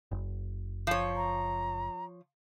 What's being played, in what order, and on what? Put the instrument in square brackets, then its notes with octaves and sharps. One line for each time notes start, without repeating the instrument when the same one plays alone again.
[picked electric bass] F#1
[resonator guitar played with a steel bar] F3 C#5
[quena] A#5